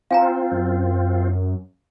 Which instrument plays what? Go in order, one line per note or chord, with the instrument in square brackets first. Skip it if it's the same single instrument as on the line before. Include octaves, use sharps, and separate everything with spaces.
[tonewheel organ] C4 F4 [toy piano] F5 G#5 A#5
[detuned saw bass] F#2